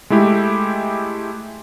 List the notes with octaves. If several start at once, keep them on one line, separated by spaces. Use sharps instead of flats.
G#3 A3 E4 G4